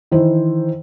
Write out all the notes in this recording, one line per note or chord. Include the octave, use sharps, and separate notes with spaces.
D#3 E3 E4 C5